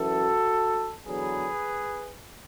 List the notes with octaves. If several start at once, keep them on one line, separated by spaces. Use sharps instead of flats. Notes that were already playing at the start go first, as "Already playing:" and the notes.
Already playing: F#2 E3 F#4 A4
E2 D3 F#3 G#4 B4